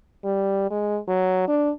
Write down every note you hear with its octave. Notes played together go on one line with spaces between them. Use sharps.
G3
G#3
F#3
D4